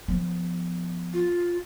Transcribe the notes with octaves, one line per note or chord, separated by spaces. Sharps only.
F3 B3
F4